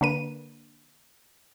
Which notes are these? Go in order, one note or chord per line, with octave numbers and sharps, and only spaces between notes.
D3 A#3 B4 D#7